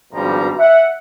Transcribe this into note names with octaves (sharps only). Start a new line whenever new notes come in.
G#1 G2 B2 F3 G3 A#5
E5 F#5